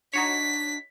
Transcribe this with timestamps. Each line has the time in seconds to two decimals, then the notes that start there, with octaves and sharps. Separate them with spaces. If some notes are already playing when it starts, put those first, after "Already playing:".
0.13 D4 D#4 F#4 C#5 B6